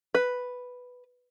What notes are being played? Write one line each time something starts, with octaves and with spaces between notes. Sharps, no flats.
B4